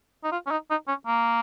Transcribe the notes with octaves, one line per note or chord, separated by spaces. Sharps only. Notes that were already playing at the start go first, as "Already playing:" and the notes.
D#4
F4
C#4
D#4
D#4
C#4
A#3